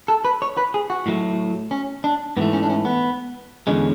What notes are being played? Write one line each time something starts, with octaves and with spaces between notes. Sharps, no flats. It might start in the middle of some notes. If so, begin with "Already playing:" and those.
A4
B4
C#5
B4
G#4
F#4
A2 F#3 A3
C#4
D4
G#2 E3 A3 B3
C#4
D4
C#4
B3
E2 D3 G#3 C#4